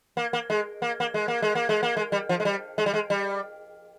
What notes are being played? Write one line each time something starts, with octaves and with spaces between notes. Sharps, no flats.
A#3
A#3
G#3
A#3
A#3
G#3
A#3
G#3
A#3
G#3
A#3
G#3
G3
F3
G#3
G3
G#3
G3
G#3
G3